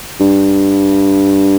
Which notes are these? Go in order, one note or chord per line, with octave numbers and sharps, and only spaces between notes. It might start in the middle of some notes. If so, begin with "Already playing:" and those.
G2